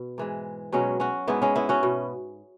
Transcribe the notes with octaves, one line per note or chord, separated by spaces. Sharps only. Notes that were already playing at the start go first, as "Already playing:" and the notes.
Already playing: B2
G#2 E3 G#3
B2 F#3 G#3 C#4
C#4 F#4
G#2 G#3 B3 E4
G#3 C#4
B3 E4
C#4 F#4
B2